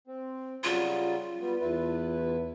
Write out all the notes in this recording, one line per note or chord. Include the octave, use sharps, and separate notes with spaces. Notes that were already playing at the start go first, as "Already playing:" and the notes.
C4
C#3 F#3 G3 F4
G3 B3
E2 E4 B4